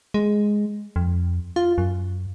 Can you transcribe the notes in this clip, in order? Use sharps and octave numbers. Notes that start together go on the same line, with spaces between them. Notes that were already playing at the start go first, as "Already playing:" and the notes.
G#3
F2
F4
F#2